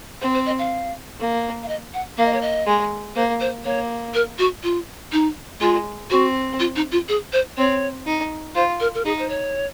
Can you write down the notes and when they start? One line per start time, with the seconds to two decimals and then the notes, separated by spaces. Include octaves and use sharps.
0.21 C4 C5
0.34 C5
0.46 D#5
0.59 F5
1.20 A#3
1.63 F5
1.68 D#5
1.94 F#5
2.17 A#3 F5
2.26 D#5
2.34 C#5
2.42 D#5
2.67 G#3
3.15 A#3 C5
3.40 C5
3.65 A#3 C#5
4.14 A#4
4.39 F#4
4.63 F4
5.12 D#4
5.61 G#3 F4
6.10 C4 F#4
6.60 F4
6.76 D#4
6.92 F4
7.09 G#4
7.33 C5
7.58 C4 C#5
8.07 D#4
8.55 F4 C5
8.80 A#4
8.95 A#4
9.05 D#4 G#4
9.19 C5
9.29 C#5